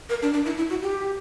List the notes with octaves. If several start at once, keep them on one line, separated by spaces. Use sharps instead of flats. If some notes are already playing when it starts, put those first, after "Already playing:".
A#4
D4
D4
E4
E4
F#4
G4